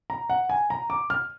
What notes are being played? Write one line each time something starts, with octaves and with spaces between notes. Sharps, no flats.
A#5
F#5
G#5
A#5
D6
F6